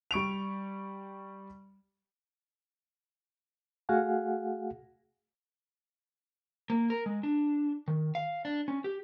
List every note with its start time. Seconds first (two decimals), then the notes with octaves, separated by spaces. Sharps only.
0.11 G3 C#6 D7 F7
3.89 A3 F#4 G#4 F5 F#5 G#5
6.70 A#3
6.90 A#4
7.06 G#3
7.23 D4
7.88 D#3
8.15 F5
8.45 D4
8.68 C#4
8.84 G4